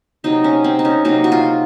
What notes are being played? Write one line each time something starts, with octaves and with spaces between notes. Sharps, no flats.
C3 F#3 A#3 D#4
C#4
C4
D#4
C#4
C3 F#3 A#3 D#4
F#4
F4